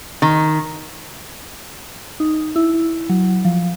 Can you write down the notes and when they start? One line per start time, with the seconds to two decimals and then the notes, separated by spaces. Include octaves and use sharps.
0.22 D#3
2.20 D#4
2.56 E4
3.09 F#3
3.45 F3